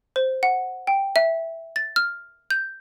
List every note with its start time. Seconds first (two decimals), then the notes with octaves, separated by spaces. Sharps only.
0.16 C5
0.43 F#5
0.87 G5
1.16 E5
1.76 A6
1.96 F6
2.50 G6